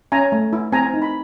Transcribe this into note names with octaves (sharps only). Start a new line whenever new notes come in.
C#4 G#5 A#5
A3
E4
C4 G#5 A#5
D#4
B5